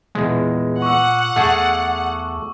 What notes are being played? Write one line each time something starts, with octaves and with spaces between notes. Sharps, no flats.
E2 A#2 G#3
F#5 C#6 D6 E6
E2 A3 G#4 A4